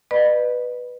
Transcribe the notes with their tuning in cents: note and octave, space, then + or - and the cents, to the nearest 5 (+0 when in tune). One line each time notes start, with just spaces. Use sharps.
B4 +0 D#5 -45 B5 +0